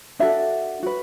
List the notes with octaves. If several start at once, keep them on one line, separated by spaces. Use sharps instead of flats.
D4 F#4 A4 E5
F#4 B4